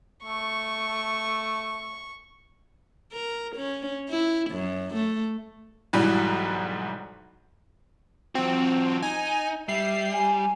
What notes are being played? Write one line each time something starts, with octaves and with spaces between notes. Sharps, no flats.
A3 C#6
A#4
C#4
E4
F#2
A3
B1 G#2 E3 F#3 G3
F3 C4 F#4
D#4 G#5
G3 E5 C7
G#5